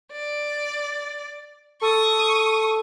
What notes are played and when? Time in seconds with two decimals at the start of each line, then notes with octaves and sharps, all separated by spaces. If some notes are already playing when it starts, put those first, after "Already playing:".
0.12 D5
1.81 A4 C#6 D#6